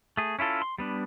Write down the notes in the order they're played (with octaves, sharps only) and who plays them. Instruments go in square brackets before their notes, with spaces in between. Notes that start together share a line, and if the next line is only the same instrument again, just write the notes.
[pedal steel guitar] A3 G#4
C#4 E4 F4 A4
C6
G3 B3 D4